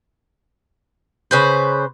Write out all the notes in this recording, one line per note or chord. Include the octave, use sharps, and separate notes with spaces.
C#3 B4 C5